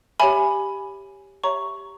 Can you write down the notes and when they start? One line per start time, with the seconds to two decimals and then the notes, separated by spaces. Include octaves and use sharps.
0.20 G4 C#5 E5 G#5 B5
1.44 G4 C#5 E5 A#5 C#6